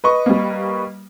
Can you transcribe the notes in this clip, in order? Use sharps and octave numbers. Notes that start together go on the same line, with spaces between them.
B4 D#5 C#6
G3 A#3